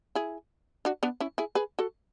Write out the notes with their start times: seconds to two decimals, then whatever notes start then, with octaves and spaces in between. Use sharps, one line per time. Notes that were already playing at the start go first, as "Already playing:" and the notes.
0.15 E4 G#4
0.85 D4 F#4
1.03 B3 D4
1.20 C#4 E4
1.38 E4 G#4
1.55 G#4 B4
1.79 F#4 A4